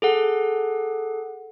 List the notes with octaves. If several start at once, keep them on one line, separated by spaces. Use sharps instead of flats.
G#4 A4 F#5